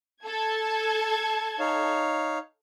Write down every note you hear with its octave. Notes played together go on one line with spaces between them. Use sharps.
A4 A5 G#6
D#4 C#5 F5